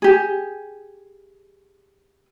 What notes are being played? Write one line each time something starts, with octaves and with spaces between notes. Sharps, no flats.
G4 G#4